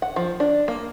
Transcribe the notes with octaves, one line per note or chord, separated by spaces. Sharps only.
F#5
F3
D4
A#3